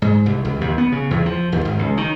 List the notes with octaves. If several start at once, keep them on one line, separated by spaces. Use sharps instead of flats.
G#2
C2
C#2
D#2
B3
C#3
E2
F3
D#2
G#1
C#2
D#3